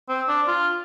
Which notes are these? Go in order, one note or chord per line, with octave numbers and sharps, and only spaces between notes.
C4
D4
F4